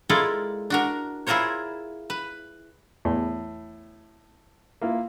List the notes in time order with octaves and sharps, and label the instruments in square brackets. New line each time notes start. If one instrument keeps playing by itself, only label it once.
[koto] G#3 E4 F4 A4 A#4 D5
D4 F#4 A#4
E4 F4 G#4 A#4 C5 C#5
B4
[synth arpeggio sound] E2 [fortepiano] A2
[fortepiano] A#3 E4 F4